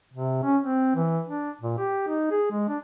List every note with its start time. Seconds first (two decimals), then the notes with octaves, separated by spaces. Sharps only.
0.14 C3
0.44 C#4
0.63 C4
0.96 E3
1.28 D4
1.61 A#2
1.78 G4
2.08 D#4
2.31 G#4
2.51 G#3
2.69 D4